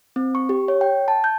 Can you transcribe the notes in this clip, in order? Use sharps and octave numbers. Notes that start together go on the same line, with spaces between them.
C4
C#6
G4
C#5
G5
A5
G6